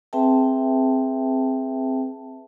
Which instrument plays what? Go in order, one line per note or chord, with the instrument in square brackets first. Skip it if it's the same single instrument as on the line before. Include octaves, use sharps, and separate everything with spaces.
[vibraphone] C4 G#4 B4 E5 G5 A5